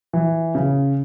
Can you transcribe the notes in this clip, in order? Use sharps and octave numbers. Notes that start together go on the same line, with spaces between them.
E3
C#3